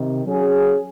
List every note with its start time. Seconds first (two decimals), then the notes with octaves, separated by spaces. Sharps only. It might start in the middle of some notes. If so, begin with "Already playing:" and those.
Already playing: C3 D#3
0.26 F#3 C#4 G#4